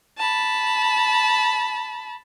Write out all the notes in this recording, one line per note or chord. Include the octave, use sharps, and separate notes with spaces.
A5 B5